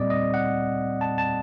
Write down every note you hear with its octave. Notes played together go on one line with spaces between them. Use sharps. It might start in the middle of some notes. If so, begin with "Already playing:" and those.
Already playing: A#2 G3 C4 D5 D#5
D#5
F#5
A5
A5